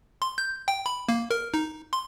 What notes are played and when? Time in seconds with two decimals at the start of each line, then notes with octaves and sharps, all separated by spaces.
0.22 C6
0.38 G6
0.68 G5
0.86 B5
1.09 A#3
1.31 A#4
1.54 D#4
1.93 C6